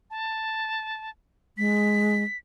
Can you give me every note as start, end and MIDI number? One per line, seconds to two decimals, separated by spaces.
0.10 1.10 81
1.58 2.23 56
1.58 2.37 95